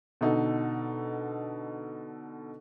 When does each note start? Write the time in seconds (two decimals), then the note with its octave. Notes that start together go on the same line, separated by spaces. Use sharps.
0.21 B2 D3 D#4 A4